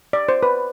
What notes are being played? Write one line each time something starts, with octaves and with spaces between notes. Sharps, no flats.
D5
C5
B4